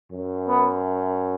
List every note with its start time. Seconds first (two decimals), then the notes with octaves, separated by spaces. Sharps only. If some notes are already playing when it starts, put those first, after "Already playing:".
0.11 F#2
0.48 B3